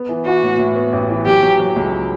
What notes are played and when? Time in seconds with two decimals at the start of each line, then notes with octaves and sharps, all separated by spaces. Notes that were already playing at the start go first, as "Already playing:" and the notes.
Already playing: B3
0.09 E3
0.26 E3 F#4
0.43 A2
0.59 A2
0.76 B3
0.93 A1
1.10 E3
1.26 F#3 G4
1.42 F#3
1.59 F#3
1.76 C#2